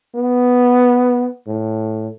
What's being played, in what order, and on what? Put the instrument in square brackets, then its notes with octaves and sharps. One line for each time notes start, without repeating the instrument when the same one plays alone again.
[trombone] B3
A2